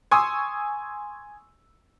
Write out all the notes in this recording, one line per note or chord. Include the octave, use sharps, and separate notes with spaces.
G#5 C6 C#6 D#6 E6